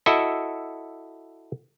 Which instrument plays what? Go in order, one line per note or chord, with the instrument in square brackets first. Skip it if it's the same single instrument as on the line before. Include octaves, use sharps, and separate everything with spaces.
[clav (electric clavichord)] E4 F#4 A4 D#5 E5